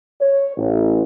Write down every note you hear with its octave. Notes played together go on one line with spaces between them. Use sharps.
C#5
A1